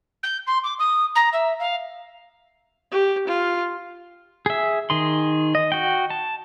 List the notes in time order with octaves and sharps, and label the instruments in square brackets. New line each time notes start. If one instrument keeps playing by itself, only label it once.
[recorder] G6
C6
D6
D#6
A#5
E5
F5
[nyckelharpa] G4
F4
[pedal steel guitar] G#4 E5
D#3 G#4 C6
D#5
F#4 G5
A5